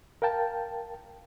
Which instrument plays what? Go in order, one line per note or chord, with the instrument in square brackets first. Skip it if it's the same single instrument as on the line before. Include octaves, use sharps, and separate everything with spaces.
[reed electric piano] A#4 F5 G5 A5